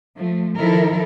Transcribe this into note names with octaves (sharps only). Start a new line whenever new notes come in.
F3 A3
D#3 F3 E4 A4 A#4